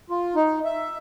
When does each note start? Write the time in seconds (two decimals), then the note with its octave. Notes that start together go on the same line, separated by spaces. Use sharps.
0.10 F4
0.35 D#4
0.65 E5